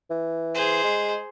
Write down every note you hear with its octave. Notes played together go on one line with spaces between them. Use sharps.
E3
G#4 C5
G#3